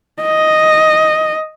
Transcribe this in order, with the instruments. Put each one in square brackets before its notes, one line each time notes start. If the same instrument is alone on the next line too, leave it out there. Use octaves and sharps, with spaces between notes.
[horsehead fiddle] D#5